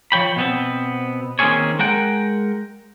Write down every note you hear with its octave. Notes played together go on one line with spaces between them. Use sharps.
F3 C#5 G5 B5
B2 B3 C4
D#3 A#3 C4 C#4 G#4 C#5
G#3 A#4 F#5 G5